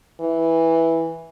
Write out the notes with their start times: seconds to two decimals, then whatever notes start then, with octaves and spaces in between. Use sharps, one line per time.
0.20 E3